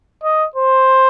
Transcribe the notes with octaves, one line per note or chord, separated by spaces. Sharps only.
D#5
C5